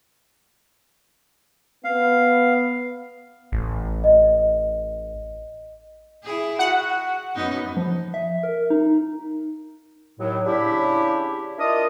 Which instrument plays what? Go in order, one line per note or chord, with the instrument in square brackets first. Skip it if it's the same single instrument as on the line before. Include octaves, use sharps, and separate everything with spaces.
[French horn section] B3 [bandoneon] F5
[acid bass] A1
[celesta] D#5
[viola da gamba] E4 G#4
[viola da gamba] F#4 [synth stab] F#5
[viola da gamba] F#2 B3 D#4
[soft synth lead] F3
E5
A#4
D#4
[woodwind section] D#2 A2 F#3
C#3 D4 E4 G4
D4 E4 F4 A#4 D#5 D#6